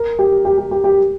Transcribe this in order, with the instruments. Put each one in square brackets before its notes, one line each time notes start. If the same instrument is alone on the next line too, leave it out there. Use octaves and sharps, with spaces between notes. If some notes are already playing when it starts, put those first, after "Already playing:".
Already playing: [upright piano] A#4
G4
G4
G4
G4
G4